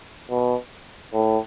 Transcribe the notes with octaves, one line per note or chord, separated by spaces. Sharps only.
B2
A2